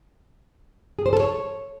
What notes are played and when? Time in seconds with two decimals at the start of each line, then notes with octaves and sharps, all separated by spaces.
0.99 G#4
1.06 C5
1.13 A4
1.20 C#5